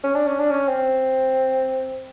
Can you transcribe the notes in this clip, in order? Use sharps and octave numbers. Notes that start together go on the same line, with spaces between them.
C#4
D4
C#4
D4
C#4
C4